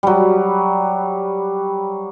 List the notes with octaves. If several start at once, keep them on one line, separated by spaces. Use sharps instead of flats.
F#3 G3